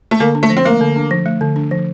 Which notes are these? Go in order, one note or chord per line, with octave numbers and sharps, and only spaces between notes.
A3
D3 A#3
D4
A3
F3
C4
A3 A#3
D3
D4
F3
A3
D3
D4
F3